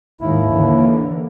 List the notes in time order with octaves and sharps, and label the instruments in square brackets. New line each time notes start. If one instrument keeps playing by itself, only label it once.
[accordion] D#2 E4 [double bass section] G#2 D#3
[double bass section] D3 E3 A#3